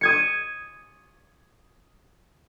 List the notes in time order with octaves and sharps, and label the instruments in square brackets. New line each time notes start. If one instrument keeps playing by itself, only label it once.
[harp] D#6 G#6 C#7